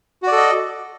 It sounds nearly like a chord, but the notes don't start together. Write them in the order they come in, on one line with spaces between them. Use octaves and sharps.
F#4 D5 A4 D#5